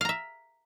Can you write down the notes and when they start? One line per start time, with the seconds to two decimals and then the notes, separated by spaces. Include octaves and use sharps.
0.01 F5
0.05 A#5
0.09 E5